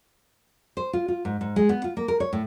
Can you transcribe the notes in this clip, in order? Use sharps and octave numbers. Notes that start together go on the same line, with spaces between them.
C5
F4
F4
G#2
G#2
G#3
B3
F4
A#3
A#4
C#5
A2